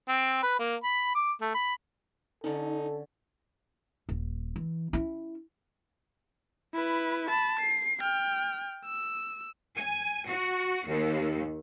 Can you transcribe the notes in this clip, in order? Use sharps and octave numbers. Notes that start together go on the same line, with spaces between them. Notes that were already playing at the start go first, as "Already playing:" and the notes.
C4
B4
A#3
B5
D6
A3
B5
D3 C#4 D#4 A4
D#1
E3
C#4 E4
E4 B4
A5 B5
C7
G5 F6
E6
G#5
F#4
D#2